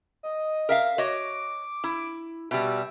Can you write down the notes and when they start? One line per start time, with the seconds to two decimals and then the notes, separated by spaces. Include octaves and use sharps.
0.23 D#5
0.69 A#4 E5 F5
0.98 F#4 C#5 D#5 D6
1.84 E4
2.51 B2 G3 E5